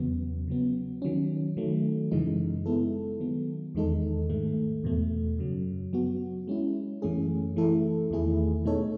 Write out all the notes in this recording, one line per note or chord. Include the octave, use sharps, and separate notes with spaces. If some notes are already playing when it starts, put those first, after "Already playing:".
Already playing: E2 C#3 F#3 B3
C#3 F#3 B3
D#3 F#3 C#4
D#3 F#3 A3
F#2 C#3 E3 G#3 D#4
G#3 B3 E4 A4
D#3 F#3 B3
E2 D#3 G#3 D#4 A4
G#2 D#3 A3
E2 B2 A3
F#2 C#3 F#3
F#3 B3 F#4
G#3 C#4 E4
F#2 E3 A3 C#4 G#4
E3 A3 E4 A4
E2 D#3 A3 E4 G#4
B2 A3 D#4 A4 C#5